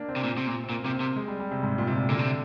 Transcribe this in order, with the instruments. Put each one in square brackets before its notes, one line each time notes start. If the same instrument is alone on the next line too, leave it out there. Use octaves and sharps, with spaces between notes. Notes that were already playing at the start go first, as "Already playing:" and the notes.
Already playing: [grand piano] A#3 D4
C4
[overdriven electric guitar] C3
A#2
C3
A#2
[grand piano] C4
[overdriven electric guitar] A#2 [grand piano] A#3
[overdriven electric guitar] C3 [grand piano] A#3
[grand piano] C4
[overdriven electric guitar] C3
[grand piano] G#3
G3
G3
C3
G#2
A#2
C3
A#2
[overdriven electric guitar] A#2 [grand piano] D3
[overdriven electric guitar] C3